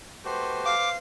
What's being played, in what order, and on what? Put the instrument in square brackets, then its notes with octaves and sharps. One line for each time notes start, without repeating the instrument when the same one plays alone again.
[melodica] A3 F#4 G4 [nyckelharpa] B4 C5
[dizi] F5 [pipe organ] D6